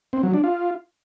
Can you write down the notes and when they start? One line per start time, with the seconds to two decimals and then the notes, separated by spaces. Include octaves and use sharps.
0.13 C4
0.23 F#3
0.33 D4
0.44 F4